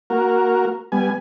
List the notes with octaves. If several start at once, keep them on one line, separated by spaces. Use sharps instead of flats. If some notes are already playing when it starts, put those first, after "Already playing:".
A#3 F#4 A#4
G3 B3 G#5